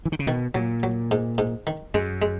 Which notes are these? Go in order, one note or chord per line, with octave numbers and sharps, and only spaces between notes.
E3
D#3
C#3
B2 D#3
A#2 F#3
F#3
G#2
G#2
D#3
F#2 G#3
G#3